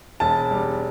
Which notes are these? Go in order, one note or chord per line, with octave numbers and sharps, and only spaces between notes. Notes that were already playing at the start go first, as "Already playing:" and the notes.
E1 A5
G3